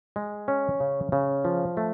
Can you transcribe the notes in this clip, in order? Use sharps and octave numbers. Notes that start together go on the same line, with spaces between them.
G#3
C#4
C#3
C#3
F3
A3